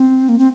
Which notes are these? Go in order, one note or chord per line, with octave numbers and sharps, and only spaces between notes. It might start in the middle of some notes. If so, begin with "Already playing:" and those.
Already playing: C4
A#3
C4